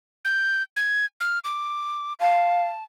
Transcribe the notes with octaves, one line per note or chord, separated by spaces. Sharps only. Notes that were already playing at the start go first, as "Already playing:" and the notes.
G6
G#6
F6
D6
F5 A5